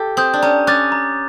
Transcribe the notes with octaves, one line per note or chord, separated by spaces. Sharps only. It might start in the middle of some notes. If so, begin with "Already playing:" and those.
Already playing: G4 A4
C4 D#6 G6
D4
C#4 A#5
C#4 D6 F#6 A6
A#5